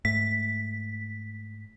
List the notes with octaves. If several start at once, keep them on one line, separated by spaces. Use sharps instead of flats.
G#2 A3 B6